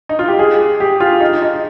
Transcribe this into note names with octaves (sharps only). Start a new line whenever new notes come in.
D#4
F4
G4
G#4
G4
F4
D#4
D#4